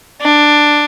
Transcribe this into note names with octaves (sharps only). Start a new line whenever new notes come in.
D4